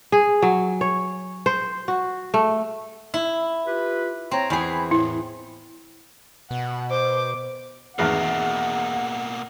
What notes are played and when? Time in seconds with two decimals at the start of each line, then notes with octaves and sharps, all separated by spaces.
0.12 G#4
0.42 F#3
0.81 C#5
1.46 C5
1.88 F#4
2.34 A3
3.14 E4
3.66 F4 G4 B4
4.31 C4 C#5 A#5
4.50 E2 G#4 G#5 B5
4.91 A2 E4
6.51 B2 F#5
6.90 C5 D6
7.99 G#1 E2 B2 D#3 A#3 G#4 F#5